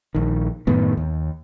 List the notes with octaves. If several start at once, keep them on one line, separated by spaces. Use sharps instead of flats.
A#1 D#3
F#2 A2 D#3 B3
D#2